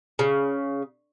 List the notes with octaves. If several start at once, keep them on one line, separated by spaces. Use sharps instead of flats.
C#3